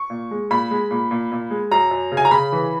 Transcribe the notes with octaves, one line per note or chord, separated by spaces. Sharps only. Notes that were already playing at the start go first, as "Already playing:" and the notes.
Already playing: C#6
A#2
G#3
A#2 B5
G#3
A#2
A#2
A#2
G#3
F#2 A#5
F#2
C#3
G#5
A#5
C#3 B5
E3